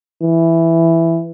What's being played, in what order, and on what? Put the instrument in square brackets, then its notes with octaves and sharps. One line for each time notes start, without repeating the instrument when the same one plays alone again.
[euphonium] E3